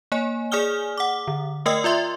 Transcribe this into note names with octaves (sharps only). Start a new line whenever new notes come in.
A#3 C#5 G#5
G#4 D5 G#5 D#6 F6 G7
F#5 D6
D3
A3 A#4 D#5 G5 D#6 E6
F4 D5 E5 C6